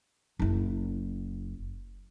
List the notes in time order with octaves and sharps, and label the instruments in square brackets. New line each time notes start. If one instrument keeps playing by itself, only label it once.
[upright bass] F#1 E4